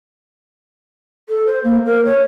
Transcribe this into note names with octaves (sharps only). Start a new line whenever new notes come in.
A4
C5
A#3
A#4
C#5